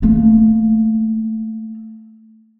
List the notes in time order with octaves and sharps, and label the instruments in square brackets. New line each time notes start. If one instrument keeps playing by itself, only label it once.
[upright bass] A3 A#3